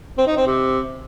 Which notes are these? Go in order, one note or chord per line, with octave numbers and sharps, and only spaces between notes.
C4
D#4
C4
C3